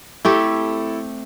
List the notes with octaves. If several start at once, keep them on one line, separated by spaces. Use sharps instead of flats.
A3 C4 E4 G4 A4